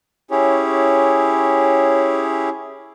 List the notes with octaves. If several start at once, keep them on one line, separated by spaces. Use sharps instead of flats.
C#4 E4 G4 G#4 C#5